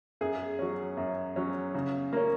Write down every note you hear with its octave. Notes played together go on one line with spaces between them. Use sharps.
F#2 G#4
F#3 C#4
F#2
F#3 C#4
C#3
A#3 C#4